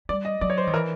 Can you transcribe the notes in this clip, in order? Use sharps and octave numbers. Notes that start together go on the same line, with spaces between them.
G3 D5
D#5
F#3 D5
C#5
C5
D#3
E3 A#4